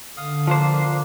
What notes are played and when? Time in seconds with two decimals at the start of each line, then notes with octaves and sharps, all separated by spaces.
0.17 D3 F5 D#6
0.48 F3 A#3 D4 C5